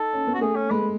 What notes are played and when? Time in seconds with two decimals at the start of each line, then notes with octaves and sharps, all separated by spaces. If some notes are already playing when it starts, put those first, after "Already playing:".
Already playing: D#4 A4
0.13 C#4
0.27 B3
0.34 F#4
0.41 A3 G#4
0.56 C#4
0.71 G#3 B4